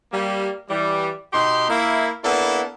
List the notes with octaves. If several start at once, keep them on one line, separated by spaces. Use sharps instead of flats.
G3 A#3
E3 G3
B2 D#4 G4 C6
A#3 E4
A#3 B3 D4 E4 A4